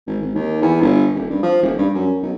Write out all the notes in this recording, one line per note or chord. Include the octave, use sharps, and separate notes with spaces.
G#1
G#1
D#2
E2
G1
D#1
G2
F3
D#1
G2
F#2
B1